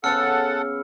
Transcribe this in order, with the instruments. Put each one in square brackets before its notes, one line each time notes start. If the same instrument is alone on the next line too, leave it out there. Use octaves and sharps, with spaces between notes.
[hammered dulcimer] C#3 B3 [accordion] A4 F#5 [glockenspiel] E6 F6 C#7